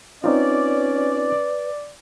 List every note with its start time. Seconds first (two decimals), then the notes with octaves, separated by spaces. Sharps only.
0.24 C4 C#4 D#4 F4 B4 D5